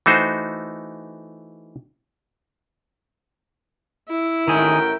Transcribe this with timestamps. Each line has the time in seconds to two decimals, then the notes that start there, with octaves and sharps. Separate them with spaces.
0.06 E3 A3 D#4 F#4 C5
4.09 E4
4.48 A1 D#3 G#4 A#4 C#5 F#5 G5